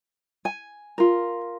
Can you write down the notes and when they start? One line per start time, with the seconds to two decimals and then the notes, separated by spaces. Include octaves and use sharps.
0.45 G#5
0.98 F4 A#4